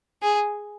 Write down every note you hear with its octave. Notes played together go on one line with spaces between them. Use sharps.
G#4